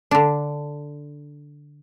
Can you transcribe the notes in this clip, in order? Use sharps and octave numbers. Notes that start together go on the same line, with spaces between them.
D3 D4